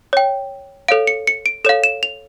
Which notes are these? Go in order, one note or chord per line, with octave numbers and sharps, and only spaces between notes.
C#5 G5
A4 C#5 F5 D7
C#7
C#7
D7
A4 C#5 F5 E7
E7
F7